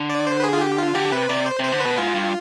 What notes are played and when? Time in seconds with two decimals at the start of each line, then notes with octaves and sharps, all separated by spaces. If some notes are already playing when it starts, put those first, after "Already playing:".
Already playing: D3
0.10 D5
0.27 C5
0.40 B4
0.44 G#4
0.53 F4
0.61 G4
0.78 F4
0.95 D3 G4
1.12 C3 B4
1.29 C3 D5
1.46 C5
1.59 C3 C5
1.72 D3
1.80 B2 B4
1.98 G#2 F4
2.15 G2